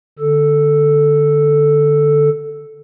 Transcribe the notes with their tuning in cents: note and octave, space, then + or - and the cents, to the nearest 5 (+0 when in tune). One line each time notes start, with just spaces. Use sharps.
D3 +5 A4 +0